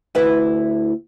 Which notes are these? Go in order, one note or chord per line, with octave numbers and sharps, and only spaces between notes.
D2 E4 B4